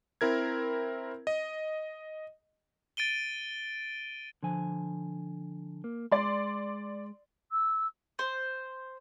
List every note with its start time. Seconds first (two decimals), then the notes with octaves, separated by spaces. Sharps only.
0.21 C4 E4 A#4 G#6
1.27 D#5
2.97 A6 D7 D#7 G7
4.43 D3 F3 G#5
5.84 A#3
6.12 G#3 D5 C6
7.51 E6
8.19 C5